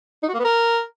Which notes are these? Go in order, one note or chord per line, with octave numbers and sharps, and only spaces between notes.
D#4
F#4
A#3
B3
A#4